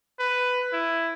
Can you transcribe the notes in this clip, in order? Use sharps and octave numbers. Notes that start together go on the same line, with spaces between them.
B4
E4